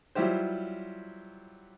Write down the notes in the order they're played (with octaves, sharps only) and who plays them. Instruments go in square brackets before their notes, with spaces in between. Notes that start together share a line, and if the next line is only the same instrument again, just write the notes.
[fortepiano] F#3 G3 E4 F4 G4 C5